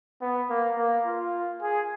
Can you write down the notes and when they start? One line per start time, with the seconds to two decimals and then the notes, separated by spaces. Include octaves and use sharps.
0.21 B3
0.49 A#3
0.77 A#3
1.05 F4
1.62 G#4